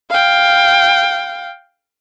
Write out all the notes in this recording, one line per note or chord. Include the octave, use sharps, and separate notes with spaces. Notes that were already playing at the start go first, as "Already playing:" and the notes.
F5 G5